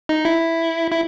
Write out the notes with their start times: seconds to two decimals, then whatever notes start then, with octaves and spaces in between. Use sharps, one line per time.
0.09 D#4
0.25 E4
0.91 E4